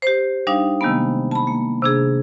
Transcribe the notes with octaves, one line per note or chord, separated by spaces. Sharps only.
G4 C5
G3 D4 D#4 F5
C3 D#3 G3 G#3 A#3 B3
A5 B5
A#3
C3 D4 G#4